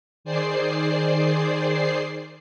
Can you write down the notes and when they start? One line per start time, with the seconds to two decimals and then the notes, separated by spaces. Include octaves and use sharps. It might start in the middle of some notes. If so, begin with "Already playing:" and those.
0.25 D#3 G#4 C5 D5 C7